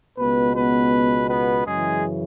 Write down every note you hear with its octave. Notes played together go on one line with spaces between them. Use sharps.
C#2 B2 B3 B4
B3 B4
B3 B4
F#2 C#3 E3 G#3 G#4